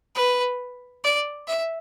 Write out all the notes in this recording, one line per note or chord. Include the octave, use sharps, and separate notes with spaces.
B4
D5
E5